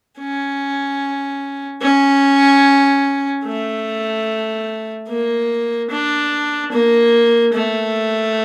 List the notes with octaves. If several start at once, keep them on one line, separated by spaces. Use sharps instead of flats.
C#4
C#4
A3
A#3
D4
A#3
A3